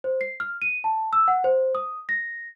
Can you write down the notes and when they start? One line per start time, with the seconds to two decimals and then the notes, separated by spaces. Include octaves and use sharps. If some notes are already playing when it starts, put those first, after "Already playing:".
0.04 C5
0.21 C7
0.40 F6
0.62 D#7
0.84 A5
1.13 E6
1.28 F#5
1.44 C5
1.75 D#6
2.09 A#6